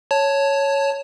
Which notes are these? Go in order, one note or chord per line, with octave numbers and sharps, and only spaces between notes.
C#5 A5